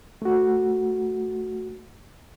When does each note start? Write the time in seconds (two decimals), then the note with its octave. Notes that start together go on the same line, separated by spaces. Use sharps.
0.22 A3 F#4